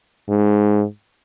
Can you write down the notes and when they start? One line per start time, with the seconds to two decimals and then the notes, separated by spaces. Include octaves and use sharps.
0.29 G#2